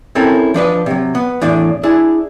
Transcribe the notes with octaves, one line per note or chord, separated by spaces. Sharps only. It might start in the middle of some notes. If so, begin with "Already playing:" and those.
C4 C#4 E4 A4 A#4 C#5
F3 D4 B4 D#5
C3 F#3
B3
E2 A2 D4
D4 E4 G#4